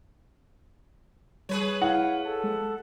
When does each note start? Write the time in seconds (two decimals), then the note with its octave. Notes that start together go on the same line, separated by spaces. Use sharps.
1.49 G3 G#4 B4 C#5
1.82 E4 F5 F#5
2.25 A4 A5
2.44 G#3